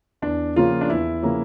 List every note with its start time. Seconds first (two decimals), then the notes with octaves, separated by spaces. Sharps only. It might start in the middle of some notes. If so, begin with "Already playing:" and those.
0.22 E2 D4
0.56 C#3 F3 A#3 C#4 F4
0.81 D4
0.89 E2 E4
1.23 C#3 F3 A#3 C#4